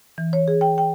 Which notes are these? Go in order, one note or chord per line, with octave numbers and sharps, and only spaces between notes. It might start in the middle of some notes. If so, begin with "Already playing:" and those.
E3
C#5
G#4
G5
G5